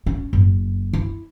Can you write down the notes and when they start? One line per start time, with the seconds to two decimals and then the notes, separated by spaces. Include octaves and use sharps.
0.06 C#4
0.33 F#1
0.93 E4